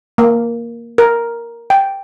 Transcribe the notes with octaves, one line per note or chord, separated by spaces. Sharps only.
A#3
A#4
G5